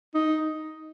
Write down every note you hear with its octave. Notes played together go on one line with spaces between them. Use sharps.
D#4